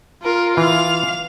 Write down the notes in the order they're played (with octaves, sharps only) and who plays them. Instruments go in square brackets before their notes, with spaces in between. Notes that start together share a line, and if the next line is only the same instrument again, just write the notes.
[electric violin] F4 [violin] A#4
[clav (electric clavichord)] E3 [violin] F5 F7